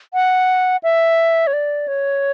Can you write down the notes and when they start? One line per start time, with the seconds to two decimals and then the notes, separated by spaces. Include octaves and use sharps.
0.14 F#5
0.83 E5
1.47 C#5
1.53 D5
1.88 C#5